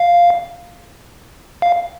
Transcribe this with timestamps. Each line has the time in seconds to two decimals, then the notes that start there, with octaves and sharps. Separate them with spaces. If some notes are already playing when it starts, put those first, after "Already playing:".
Already playing: F5
1.62 F5